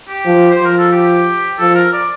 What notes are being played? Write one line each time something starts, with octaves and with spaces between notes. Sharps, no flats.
G4
F3
C5
F3
A#4
A4
G4
F3 A4
A#4
D5